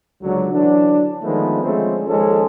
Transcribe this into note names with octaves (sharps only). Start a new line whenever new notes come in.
C#2 D3 F#3
D3 E3 F#3 D4
D3 D#3 F3 G#3 A3 B3
D3 F3 G#3 A3 C4 C#4
D#2 F3 G#3 C#4 A4